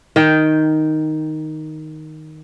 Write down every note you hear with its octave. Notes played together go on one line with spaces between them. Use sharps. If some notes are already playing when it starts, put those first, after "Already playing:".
D#3 G5